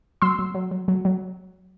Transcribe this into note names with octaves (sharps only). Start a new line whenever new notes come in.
F#3 C6 E6
F#3
F#3
F#3
F#3
F#3